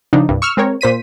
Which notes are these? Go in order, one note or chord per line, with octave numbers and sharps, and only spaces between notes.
C#3 F3 D4 D#4
C2 G2
C#6 E6 F6
G#3 C4 A#4 C#5
A#2 C5 B6 D#7